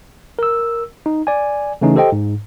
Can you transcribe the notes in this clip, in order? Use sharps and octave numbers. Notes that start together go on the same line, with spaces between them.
A#4 E6
D#4
D5 G#5
C#3 E3 A3 C#4 D#4
G4 A4 C5 D#5 G5
G#2